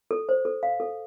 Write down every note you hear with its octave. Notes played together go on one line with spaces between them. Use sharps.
A4
C5
A4
F5
A4